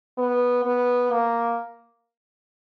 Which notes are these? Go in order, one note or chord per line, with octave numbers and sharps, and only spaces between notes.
B3
B3
A#3